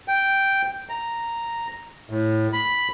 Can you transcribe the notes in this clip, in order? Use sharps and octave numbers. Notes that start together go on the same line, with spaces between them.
G5
A#5
A2
B5